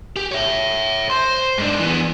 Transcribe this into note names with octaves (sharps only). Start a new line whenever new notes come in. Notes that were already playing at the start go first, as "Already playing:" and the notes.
G4
C#5 E5
C5 C6
G#2 D4
E3 B3